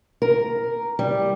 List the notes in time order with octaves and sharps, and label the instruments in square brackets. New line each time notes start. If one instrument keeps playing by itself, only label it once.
[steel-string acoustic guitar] A#4
G3